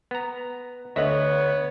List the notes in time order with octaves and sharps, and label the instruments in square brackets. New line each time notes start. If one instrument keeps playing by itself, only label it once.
[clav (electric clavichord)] B3 A#5
[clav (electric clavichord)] D2 F#5 [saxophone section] B3 C#5 [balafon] A4 D#5 E5